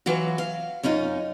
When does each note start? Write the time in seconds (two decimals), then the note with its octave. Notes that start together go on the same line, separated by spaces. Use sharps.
0.06 E3 F#3 F4 F#4
0.38 F5
0.83 F#2 C#4 D#4 F4